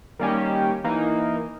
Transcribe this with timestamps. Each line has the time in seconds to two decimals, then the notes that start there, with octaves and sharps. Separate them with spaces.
0.19 D#3 G3 A#3 C#4 G4
0.84 E3 A#3 D#4